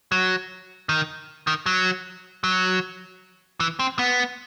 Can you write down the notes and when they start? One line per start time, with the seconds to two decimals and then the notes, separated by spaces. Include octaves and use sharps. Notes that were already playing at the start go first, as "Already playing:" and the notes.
0.12 F#3
0.89 D#3
1.47 D#3
1.66 F#3
2.44 F#3
3.60 E3
3.79 C4
3.99 B3